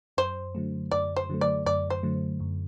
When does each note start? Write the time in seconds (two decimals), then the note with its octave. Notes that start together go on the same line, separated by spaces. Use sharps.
0.18 F#2 C5
0.55 D3 F#3 A3
0.91 F#2 D5
1.16 C5
1.30 D3 F#3 A3
1.41 D5
1.66 F#2 D5
1.90 C5
2.03 D3 F#3 A3
2.40 F#2